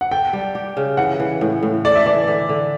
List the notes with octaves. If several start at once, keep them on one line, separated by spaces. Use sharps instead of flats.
F#5
A4 G5
G3
G4
C#3
E3 F#5
E3
A2
A2
A4 D5
E5
E3 D5
D3
D3